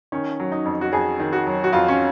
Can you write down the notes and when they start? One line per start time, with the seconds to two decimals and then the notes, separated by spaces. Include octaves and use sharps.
0.12 D#3 C#4
0.40 F#3
0.52 D#4
0.65 F2
0.81 F#4
0.93 F2 G#4
1.20 D#3
1.33 F#4
1.47 F#3
1.64 F#4
1.73 F2 F4
1.88 C#4